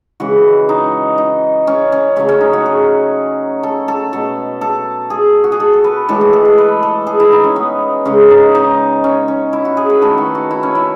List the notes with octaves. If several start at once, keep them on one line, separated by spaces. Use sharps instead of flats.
C#3 E3 G#3 F#4
D#4
D#4
C#4
C#4
C#3 F#3 A3 C#4
C#4
D#4
F#4
G#4
A4
A4
B2 A3 A4
A4
G#4
F#4
G#4
A4
A4
B4
A2 E3 G#3 A4
A4
G#4
A4
B4
A4
G#4
E4
D#4
C#4
B3
C#3 G#3 C#4
D#4
D#4
C#4
C#4
E4
F#4
G#4
B4
D#3 A3 A4
F#4
F#4
E4
C#4
E4